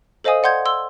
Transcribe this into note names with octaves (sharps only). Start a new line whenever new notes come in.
A4 C5 D#5 F5 G#5 D#6
D5 F#5 C6 G6 G#6
C6 E6 G7